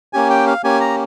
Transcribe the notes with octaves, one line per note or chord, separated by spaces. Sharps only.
A#3 C#4 G4 G#5
G5
F5
A#3 C#4 G4 G#5
A#5